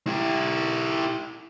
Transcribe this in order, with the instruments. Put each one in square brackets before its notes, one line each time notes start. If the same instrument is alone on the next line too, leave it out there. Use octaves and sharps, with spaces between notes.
[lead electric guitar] E4 G4